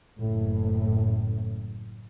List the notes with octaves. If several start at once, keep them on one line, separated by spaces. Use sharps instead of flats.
F#1 A2